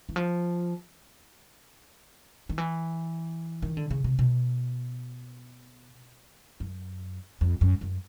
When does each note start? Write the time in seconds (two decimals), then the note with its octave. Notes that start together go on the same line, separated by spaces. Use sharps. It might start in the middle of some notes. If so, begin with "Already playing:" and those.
0.09 E3
0.16 F3
2.49 D#3
2.58 E3
3.62 D#3
3.77 D3
3.90 C#3
4.04 C3
4.19 B2
6.60 F#2
7.41 F2
7.61 F#2
7.81 F#2